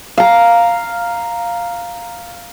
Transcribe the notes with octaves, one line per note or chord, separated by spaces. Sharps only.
F5 A#5